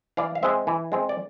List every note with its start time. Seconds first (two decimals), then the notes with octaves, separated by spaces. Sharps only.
0.17 E3 D5 F5
0.35 F5
0.43 G#3 C4 C5 E5
0.67 E3
0.92 G#3 C4
1.09 D5